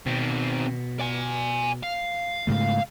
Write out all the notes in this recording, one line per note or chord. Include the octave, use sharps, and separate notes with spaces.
B2 D#3 C4
D5 G#5
F5
G#2 C#3 A3